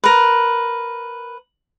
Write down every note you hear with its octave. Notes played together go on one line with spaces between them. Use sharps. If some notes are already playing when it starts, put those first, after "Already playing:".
A#4 B4